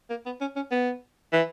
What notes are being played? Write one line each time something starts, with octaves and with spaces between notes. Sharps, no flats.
A#3
B3
C#4
C#4
B3
E3